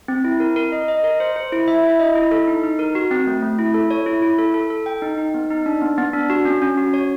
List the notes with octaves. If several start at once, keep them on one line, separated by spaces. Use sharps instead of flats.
C4
E4
A#4
A#4
D#5
D#5
A#4
C5
C5
E4
E5
E4
D#5
E4
A4
D#4
D#4
A#4
F#4
C4
A3
A3
E4
A4
C#5
E4
E4
A4
A4
A4
G5
D#4
D#4
B3
D#4
D4
B3
B3
D4
F#4
C#4
C#4
F#4
C#5